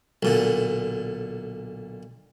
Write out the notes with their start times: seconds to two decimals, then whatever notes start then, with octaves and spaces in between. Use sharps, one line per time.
0.23 B1 A#2 D3